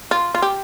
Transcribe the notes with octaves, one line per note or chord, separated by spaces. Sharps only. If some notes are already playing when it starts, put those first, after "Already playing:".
F4
F4
G4